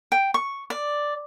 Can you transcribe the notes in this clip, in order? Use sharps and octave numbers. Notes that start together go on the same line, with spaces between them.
G5
C#6
D5